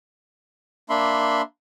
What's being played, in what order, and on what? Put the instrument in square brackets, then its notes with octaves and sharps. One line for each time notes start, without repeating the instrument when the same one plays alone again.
[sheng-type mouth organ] A#3 D4 E5 B5 C6